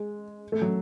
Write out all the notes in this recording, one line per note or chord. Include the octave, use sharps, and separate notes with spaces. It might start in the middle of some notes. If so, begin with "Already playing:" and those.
Already playing: G#3
A3
F#3